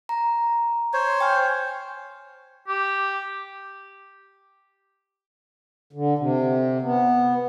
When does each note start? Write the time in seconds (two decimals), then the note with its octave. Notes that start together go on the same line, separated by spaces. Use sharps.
0.09 A#5
0.93 C5 C#5
1.21 G5 G#5 F6
2.68 G4
5.93 D3
6.18 C3
6.82 B3